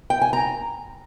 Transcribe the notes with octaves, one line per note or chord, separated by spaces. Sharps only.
G5
G#5
A#5